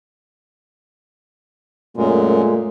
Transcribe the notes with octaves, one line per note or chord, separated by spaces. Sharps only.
F#2 A#2 G#3 A3